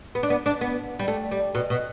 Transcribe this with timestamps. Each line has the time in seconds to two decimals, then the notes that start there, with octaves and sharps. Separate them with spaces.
0.15 B3
0.23 D4
0.30 B3
0.46 D4
0.61 B3
0.99 G3
1.08 A3
1.31 G3
1.55 B2
1.70 B2